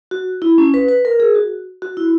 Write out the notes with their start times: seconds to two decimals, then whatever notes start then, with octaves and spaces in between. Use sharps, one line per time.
0.11 F#4
0.42 E4
0.58 C#4
0.74 B4
0.89 B4
1.05 A#4
1.20 G#4
1.35 F#4
1.82 F#4
1.97 E4